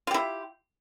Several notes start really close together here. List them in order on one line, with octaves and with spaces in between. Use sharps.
F4 G4 E4